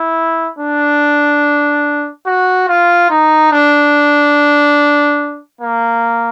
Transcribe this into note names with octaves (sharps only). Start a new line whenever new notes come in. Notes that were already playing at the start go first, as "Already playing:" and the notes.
Already playing: E4
D4
F#4
F4
D#4
D4
A#3